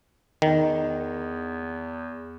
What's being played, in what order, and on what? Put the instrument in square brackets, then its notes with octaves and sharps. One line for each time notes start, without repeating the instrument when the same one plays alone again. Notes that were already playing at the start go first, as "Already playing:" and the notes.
[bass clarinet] E2 [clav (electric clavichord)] D#3